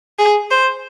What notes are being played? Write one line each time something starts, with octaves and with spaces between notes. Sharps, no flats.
G#4
C5